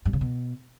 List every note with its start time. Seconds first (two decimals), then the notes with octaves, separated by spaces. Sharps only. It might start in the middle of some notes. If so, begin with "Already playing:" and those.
0.05 G2
0.13 C#3
0.21 B2